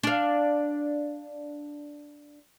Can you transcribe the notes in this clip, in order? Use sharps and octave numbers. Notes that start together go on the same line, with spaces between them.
D4 F5